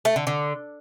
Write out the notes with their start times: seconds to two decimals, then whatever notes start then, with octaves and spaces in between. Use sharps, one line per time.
0.05 A3
0.16 D3
0.27 D3